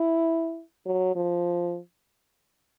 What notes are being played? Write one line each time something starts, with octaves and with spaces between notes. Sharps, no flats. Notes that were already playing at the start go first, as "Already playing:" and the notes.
Already playing: E4
F#3
F3